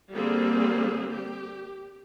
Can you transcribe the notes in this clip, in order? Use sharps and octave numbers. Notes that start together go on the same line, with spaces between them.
D3 G3 A#3 C4 G#4
G4